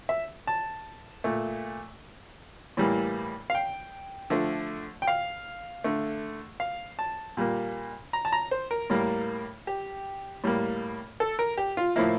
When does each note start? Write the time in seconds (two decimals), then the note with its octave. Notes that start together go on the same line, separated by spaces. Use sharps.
0.09 E5
0.47 A5
1.24 A#2 A3
2.77 A2 E3 G3 A#3
3.50 F5
3.55 G5
4.30 D3 F3 A3
5.02 G5
5.07 F5
5.84 D3 A3
6.60 F5
6.99 A5
7.37 A#2 G3 A#3
8.13 A#5
8.25 A5
8.32 A#5
8.51 C5
8.71 A#4
8.90 A2 G3 A#3
9.67 G4
10.44 A2 G3 A#3
11.20 A4
11.39 A#4
11.58 G4
11.77 F4
11.96 A2 F3 A#3 E4